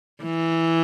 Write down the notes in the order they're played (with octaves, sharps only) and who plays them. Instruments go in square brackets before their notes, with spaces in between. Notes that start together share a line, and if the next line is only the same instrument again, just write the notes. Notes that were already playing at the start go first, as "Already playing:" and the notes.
[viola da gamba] E3